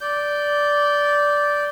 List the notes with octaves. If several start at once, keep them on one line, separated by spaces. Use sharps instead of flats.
D5 G6